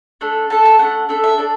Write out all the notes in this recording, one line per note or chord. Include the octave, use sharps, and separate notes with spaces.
A3 D4 A4
A3 D4 A4 A5
A5
A3 D4 A4 F#5
A3 D4 A4 E5
E5
D4 A4 D5